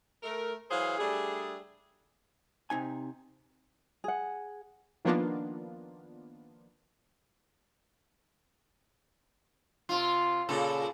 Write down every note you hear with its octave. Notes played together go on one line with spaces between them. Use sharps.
A3 A#4
E3 F#3 G#4 C5 F5
G3 A3 D4 G#4
C3 D#4 G#5
G#4 F#5
D#3 F3 A#3 B3 D4 F4
C3 F4
A#2 C#3 A4